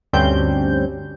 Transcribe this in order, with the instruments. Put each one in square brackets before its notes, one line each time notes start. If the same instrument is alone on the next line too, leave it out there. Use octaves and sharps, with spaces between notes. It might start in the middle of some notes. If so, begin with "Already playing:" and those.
[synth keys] D2 G2 G3 C4 C#4 G6